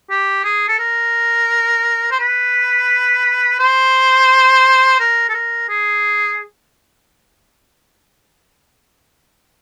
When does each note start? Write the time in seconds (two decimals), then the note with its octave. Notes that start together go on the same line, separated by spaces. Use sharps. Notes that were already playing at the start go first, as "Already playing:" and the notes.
0.10 G4
0.44 G#4
0.68 A4
0.79 A#4
2.11 C5
2.19 B4
3.59 C5
5.00 A#4
5.30 A4
5.34 A#4
5.69 G#4